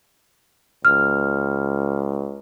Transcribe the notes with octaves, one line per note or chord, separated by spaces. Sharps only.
C#2 F6